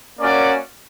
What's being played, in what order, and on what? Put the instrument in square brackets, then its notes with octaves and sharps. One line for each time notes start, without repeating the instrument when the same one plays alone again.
[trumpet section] A#3 C#4 F#4 D5